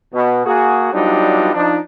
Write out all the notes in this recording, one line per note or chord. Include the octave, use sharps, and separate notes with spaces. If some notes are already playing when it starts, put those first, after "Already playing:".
B2
A#3 F#4 G#4
F#3 G3 B3 D4 D#4 F4
F3 D4 D#4